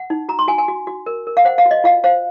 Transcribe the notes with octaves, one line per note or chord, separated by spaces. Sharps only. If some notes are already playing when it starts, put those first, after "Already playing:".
Already playing: F#5
D#4
F#4 A#5
C6
F#4 G#5
G#5
F#4
F#4
A#4
A#4
F5
C5 F#5
F5
F#4
D#5
F4 F5
C5 F5